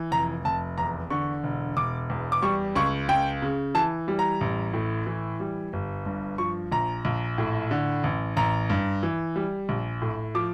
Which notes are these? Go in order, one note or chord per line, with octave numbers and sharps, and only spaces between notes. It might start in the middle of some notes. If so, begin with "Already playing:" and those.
Already playing: E3
F1 A#5
F1 A5
E2 A#5
D3 C#6
E1
E1 D6
E2
D6
G3 C#6
C#2 C#6
C#2 G5
C#3
E3 A5
G3
A#5
A1
A2
E3
G3
G1
G2
F3 C#6
A#1 A#5
A#1
A2
D3
A1
A1 A#5
G2
E3
G3
A#1
A2
F3 D6